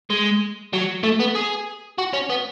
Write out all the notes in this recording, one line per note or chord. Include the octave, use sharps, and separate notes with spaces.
G#3
F#3
A3
B3
G#4
F#4
C#4
B3